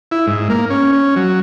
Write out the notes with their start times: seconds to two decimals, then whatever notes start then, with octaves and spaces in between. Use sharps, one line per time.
0.11 E4
0.27 G#2
0.50 A#3
0.70 C#4
0.92 C#4
1.16 F#3